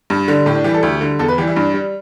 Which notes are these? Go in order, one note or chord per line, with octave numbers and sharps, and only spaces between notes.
G2
D3 G3
A2 G4
D4
E3 G3 G4
A4
D2 G4
D3 G3
E2 A4
B4
E3 G3 G4
E4
G2 D4
G3